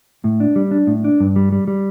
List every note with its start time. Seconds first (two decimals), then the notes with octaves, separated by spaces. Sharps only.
0.24 A2
0.40 D4
0.56 G3
0.71 D4
0.87 A2
1.04 D4
1.20 G2
1.36 G3
1.52 G3
1.67 G3